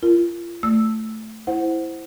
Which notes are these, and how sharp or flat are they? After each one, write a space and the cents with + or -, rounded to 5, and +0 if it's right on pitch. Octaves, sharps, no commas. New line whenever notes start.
F4 -35 A#4 +0
A3 +0 D5 +0 E6 +0
E4 +0 C5 +0 F#5 +0